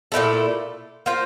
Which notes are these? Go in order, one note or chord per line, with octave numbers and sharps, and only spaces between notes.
A#2 A3 E4 A4
A#3 F4 C5